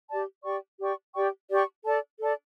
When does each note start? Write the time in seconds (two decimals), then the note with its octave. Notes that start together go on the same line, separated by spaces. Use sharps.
0.09 G4 D5 A5
0.44 G4 D5 G5 C#6
0.80 G4 D5 G5 C#6
1.14 G4 D5 G5 C#6
1.50 G4 D5 G5 C#6
1.84 A4 D5 A5
2.19 A4 D5 A5